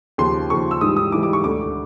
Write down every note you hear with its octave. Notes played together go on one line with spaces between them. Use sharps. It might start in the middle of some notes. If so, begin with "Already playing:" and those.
D#2 C#3 F3 C6
D#2 C#3 F3 C#6
E6
G#2 E3 G3 D#6
D#6
G#2 E3 G3 D6
D6
C#6
E1 D2 D3 D6